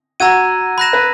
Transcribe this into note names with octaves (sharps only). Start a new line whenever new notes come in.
F#4 A#5 E6 G#6 D#7
B5 F#6 A#6 E7
B4